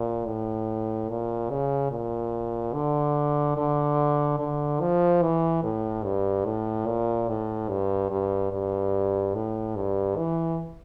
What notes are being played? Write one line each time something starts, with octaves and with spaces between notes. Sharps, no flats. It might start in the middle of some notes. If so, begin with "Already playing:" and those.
Already playing: A#2
A2
A#2
C#3
A#2
D3
D3
D3
F3
E3
A2
G2
A2
A#2
A2
G2
G2
G2
A2
G2
E3